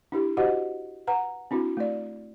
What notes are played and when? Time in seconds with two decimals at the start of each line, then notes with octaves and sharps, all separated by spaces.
0.12 D4 E4 G4
0.37 F#4 G4 C5 D#5 F#5
1.07 B4 F#5 A#5
1.51 C4 D4 E4 F#4
1.77 A3 D5